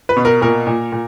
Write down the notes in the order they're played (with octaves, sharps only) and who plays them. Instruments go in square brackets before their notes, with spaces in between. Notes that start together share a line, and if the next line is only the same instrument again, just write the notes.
[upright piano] B4
B2
A#4
A#2 A#4
A#2
A#2